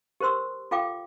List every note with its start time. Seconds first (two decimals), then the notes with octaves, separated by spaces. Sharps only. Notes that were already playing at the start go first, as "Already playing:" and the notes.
0.20 G4 A#4 C5 C6 E6
0.71 F4 A4 F5 G5 D6